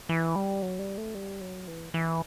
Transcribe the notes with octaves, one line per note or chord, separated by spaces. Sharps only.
E3
G3
F#3
G3
A3
G3
F#3
E3
E3